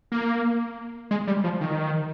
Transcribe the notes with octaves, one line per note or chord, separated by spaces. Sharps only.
A#3
G#3
G3
F3
D#3